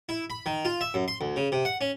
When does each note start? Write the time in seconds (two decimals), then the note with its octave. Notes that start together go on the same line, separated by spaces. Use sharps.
0.09 E4
0.30 B5
0.46 D#3
0.65 F4
0.81 E5
0.94 F#2
1.08 C6
1.21 D2
1.36 C#3
1.52 C3
1.65 F#5
1.81 C#4